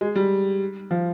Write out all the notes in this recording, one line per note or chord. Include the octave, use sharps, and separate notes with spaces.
G#3
G3
F3